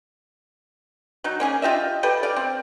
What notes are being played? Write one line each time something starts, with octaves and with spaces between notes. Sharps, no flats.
F#3 D#4
A#3 C#4 G#4
F4 G4 D#5 E5
G4 A4 B4
D5 F5
C4